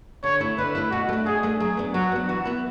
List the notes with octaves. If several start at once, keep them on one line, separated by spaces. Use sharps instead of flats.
D3 C#5
A3 E4
D3 B4
A3 E4
B2 F#4
A3 D4
B2 G#4
A3 D4
F#3 G#4
B3 D4
F#3 F#4
B3 D4
E3 F#4
B3 E4